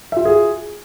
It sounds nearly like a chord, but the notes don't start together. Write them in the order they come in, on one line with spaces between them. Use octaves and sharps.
E5 F4 F#4 G#4